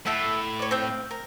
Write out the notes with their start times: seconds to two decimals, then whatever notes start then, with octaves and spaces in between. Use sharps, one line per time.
0.06 A2 A4 E5 F#5
0.59 C#5 D5
0.71 C4 F5 G5
1.11 A#4